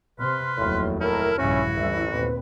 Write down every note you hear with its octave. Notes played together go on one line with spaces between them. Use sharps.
C3 B4 C6 F6
F1 D#2 A2 F#3
A2 E4 A#4 A5 F6
A#1 G2 C#3 C#4 E4 F#4
A1 D2 E3 G3
D#2 A#2 C4 B4